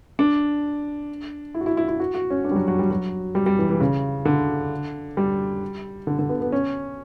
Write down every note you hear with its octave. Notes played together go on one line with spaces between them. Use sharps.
D4
E4
F#4
E4
E4
E4
F#4
F#4
C#4
D4
G3
F#3
F#3
G3
F#3
G3
G3
E3
E3
C#3
D3
G3
D3
D3
B3
B3
C#4